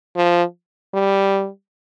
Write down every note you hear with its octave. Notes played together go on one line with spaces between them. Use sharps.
F3
G3